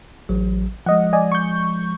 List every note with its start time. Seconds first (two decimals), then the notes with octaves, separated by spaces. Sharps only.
0.29 A1 F#3
0.86 F3 G#3 D#5 F#5
1.13 D5 D#5 G#5
1.32 C#6 G6